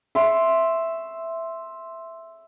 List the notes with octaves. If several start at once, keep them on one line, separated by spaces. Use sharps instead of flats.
E5 C6 C#6